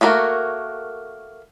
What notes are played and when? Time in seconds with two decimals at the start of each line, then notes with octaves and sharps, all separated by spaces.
0.01 A3 A#3 F#4 A#4